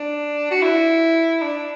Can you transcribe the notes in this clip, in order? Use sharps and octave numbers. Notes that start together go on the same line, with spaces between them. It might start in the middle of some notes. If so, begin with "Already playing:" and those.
Already playing: D4
F#4
E4
D4